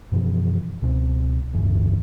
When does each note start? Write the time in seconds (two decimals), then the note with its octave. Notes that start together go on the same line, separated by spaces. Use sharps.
0.12 F#2 B2 E3 F3
0.82 C#2 B2 A3 C4
1.53 F1 D2 G2 E3